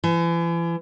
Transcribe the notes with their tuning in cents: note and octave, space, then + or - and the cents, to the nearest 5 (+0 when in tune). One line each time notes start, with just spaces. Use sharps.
E3 +40